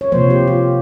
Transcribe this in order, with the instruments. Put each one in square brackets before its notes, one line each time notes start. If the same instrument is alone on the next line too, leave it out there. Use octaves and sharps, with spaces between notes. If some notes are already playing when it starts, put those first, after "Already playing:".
[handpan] C#5
C3 F3 A#3 C5
G4
F4